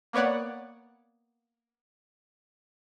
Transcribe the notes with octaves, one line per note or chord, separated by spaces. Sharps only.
A#3 B3 C#5 D5 F#5